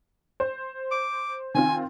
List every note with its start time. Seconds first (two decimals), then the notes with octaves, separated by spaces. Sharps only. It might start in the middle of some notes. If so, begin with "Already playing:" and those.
0.40 C5
0.91 D6
1.55 D#3 C4 F4 G#5